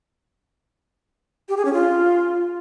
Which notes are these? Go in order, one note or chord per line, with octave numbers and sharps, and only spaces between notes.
G4
G#4
C#4
F4